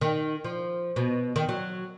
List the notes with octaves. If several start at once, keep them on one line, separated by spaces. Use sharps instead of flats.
D#3
F3
B2
D#3
F#3